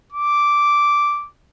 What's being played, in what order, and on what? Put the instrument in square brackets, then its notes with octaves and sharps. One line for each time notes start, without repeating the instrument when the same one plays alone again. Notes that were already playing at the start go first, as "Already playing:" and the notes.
[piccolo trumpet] D6